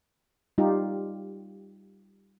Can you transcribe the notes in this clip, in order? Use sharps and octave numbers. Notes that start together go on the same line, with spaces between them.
G3 D#4 F4 G4